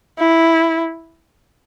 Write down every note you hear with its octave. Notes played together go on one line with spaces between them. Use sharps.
E4